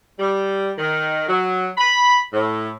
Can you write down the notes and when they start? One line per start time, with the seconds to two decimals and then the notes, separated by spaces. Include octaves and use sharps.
0.19 G3
0.78 D#3
1.28 F#3
1.78 B5
2.33 A2